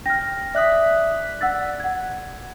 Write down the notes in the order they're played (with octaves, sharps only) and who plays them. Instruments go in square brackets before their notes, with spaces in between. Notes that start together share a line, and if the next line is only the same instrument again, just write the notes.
[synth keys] G5 [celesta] F6 A#6
[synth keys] D5 F#6 B6 [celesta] E5 D#6
[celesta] F#5 E6 A6
F#5 G#6